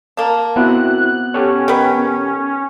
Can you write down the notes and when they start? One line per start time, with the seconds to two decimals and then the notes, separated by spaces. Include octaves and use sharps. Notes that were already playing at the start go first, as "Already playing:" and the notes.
0.17 A#3 A5
0.56 B3 C4 E4 F#4 F#6
1.34 C#4 G4 A4 C#5
1.68 D#3 B4